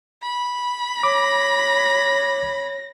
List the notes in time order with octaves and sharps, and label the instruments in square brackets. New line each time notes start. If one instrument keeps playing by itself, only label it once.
[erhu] B5
[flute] C#5 [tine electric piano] D6 [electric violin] A#6